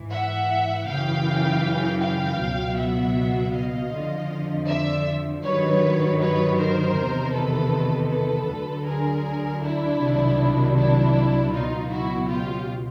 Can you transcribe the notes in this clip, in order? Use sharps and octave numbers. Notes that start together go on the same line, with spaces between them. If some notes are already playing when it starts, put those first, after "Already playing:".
Already playing: G#2 E3
E5 F#5
F#2 C#3 E3 F5 G5
F5 G5
C#2 B2 F#3
E5 F#5
D#5 F5
F2 D3 F3
D5 E5
G2 D#3 F#3 B4 C#5
B4 C#5
A#4 C5
E2 C3 D#3
A4 B4
A4 B4
D2 D3 F#3
G#4 A#4
D4 E4
C2 C3 D#3 F#3
D4 E4
C#2 B2 F#3 D#4 F4
E4 F#4
F4 G4